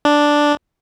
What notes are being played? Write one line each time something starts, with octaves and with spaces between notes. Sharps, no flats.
D4